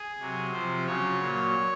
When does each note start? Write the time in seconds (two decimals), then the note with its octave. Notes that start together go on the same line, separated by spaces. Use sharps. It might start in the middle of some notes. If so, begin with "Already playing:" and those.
Already playing: G#4
0.19 C3 F#3
0.52 C3 F3 C5
0.87 C#3 F#3 C#5
1.21 A#2 F#3